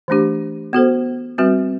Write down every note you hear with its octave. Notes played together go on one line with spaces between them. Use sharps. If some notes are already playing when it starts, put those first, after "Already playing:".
E3 A3 D4 G4
B3 F#4 A4 C5
G3 C4 F#4 B4